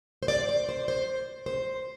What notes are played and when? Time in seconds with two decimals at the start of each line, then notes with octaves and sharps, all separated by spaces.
0.23 C5
0.28 D5
0.49 C5
0.69 C5
0.88 C5
1.46 C5